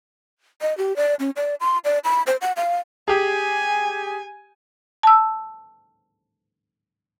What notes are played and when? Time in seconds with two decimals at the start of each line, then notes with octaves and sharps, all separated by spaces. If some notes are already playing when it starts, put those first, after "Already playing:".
0.62 D#5
0.78 G4
0.96 D5
1.20 C#4
1.36 D5
1.61 C6
1.85 D5
2.04 B5
2.27 C5
2.41 F#5
2.57 F5
3.08 G4 G#4 G#5
5.03 A5 E6